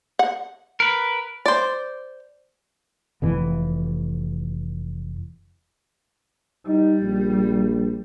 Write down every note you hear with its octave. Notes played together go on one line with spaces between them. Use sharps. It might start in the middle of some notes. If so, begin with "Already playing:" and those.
F#5
A#4 B4
C5 D5
F1 F2 E3
G3 D#4
A#1